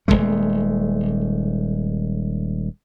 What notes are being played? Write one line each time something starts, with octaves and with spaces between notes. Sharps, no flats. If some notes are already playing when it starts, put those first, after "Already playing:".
D#1 E2 G#3 A3